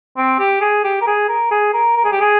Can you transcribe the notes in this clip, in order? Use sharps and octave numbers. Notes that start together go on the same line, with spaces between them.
C4
G4
G#4
G4
A#4
G#4
A#4
G#4
A#4
A#4
G#4
G4
G#4